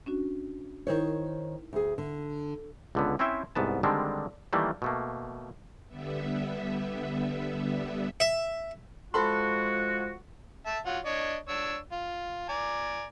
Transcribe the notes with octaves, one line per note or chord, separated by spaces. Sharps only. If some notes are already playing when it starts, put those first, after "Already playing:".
C#4 D4 F#4
D#3 D#4 E4 A#4 C5 C#5
D2 G#4
D3
C#2 D3 B3
C4 C#4 E4 C5 E5 G5
C2 G#2 B3 A5
D3 D#3 G3 G#3 C4 D4
D#3 E3 G3 A3 A#3
B2 A3 A#3
D3 G3 B3 E5
E5
F3 G#3 F#4 A4 B5 C6
E5 A5
F#3 F4 F#5
D4 C#5 D#5
D4 C#5 E6
F4
D5 G#5 A#5